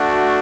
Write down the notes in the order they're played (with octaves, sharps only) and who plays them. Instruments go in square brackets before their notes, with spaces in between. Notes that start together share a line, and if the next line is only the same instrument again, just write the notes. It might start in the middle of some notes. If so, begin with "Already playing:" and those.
Already playing: [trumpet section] A3 D4 F#4